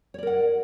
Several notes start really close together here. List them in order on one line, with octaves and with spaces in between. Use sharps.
C#5 D5 A#4 F#5